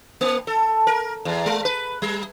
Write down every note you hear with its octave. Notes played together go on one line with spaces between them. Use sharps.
A#3
A4
A#4
E2
G#3
B4
G3